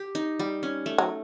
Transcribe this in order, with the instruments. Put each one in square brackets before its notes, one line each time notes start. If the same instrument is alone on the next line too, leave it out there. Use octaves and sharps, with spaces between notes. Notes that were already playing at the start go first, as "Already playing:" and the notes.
Already playing: [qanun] G4
D#4
G3
C#4
A3
[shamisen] F#3